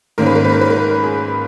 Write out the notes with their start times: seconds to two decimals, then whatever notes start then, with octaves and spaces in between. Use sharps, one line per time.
0.18 G#2 D#3 A#3 C#4 A#4
0.26 B4
0.35 A#4
0.44 B4
0.52 A#4
0.61 B4
0.70 A#4
1.03 G#4